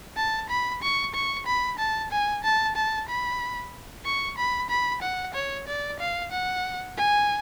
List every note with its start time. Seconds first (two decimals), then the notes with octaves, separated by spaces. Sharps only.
0.17 A5
0.50 B5
0.82 C#6
1.15 C#6
1.46 B5
1.79 A5
2.11 G#5
2.44 A5
2.76 A5
3.09 B5
4.05 C#6
4.38 B5
4.70 B5
5.02 F#5
5.34 C#5
5.67 D5
6.00 F5
6.32 F#5
6.97 G#5